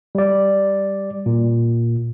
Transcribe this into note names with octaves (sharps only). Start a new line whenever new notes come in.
G3 D5
A#2